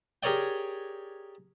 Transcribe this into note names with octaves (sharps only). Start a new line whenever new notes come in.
G4 G#4 A#4 C#5 D5 G5